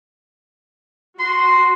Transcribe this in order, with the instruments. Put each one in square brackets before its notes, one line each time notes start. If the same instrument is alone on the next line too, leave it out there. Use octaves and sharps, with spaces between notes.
[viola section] F#4 [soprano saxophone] C6